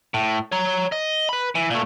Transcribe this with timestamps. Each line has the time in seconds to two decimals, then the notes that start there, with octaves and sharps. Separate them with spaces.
0.14 A2
0.52 C#5 A#5
0.92 D#5
1.29 B4 B5
1.55 E3
1.70 A#2 A3